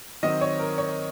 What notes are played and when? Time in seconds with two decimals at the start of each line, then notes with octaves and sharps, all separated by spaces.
0.23 D#3 F#3 C4 D#5
0.41 C#5
0.60 A#4
0.78 C#5